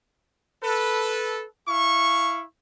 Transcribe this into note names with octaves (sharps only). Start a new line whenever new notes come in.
A4 B4
E4 F5 C#6